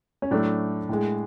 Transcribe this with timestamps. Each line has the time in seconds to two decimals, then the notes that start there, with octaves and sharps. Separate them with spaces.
0.22 C#4
0.31 A2 F#3 A3 D4
0.89 A2 G#3